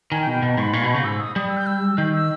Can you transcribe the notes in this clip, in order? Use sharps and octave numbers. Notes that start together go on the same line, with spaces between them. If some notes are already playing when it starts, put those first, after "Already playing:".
D#3 G#5
G5
B2
G5
B2
A#5
G#2 C#6
B5
A#2 C#6
B2 B5
C#3 C#6
G#2 E6
D#6
G3 D#6
E6
G6
E6
D#3 G6
E6